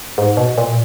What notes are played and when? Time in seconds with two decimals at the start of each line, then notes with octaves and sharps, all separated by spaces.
0.18 G#2
0.37 B2
0.58 A#2